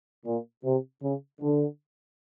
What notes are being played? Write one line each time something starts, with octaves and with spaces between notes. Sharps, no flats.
A#2
C3
C#3
D3